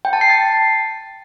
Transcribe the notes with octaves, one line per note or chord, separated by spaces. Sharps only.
G5
A5
C7
A6